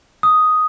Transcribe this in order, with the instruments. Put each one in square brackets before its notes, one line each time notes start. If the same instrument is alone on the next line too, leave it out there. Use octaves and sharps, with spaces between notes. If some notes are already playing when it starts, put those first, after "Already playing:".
[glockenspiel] D#6